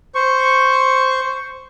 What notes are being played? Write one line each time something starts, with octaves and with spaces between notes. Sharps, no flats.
C5 C#6